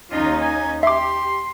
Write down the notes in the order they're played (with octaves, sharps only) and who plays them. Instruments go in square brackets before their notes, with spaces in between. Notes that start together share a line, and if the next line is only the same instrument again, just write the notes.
[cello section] D#2 C#4 D#4 [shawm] F4
[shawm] G#5
[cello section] G4 [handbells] E5 D6 [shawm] C6